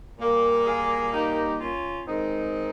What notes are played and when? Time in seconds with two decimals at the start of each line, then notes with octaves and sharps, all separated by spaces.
0.19 A#2 G3 A#3
0.66 F4 G#4
1.13 D#4 G4
1.59 C#4 F4
2.06 D#3 G#3 C4 D#4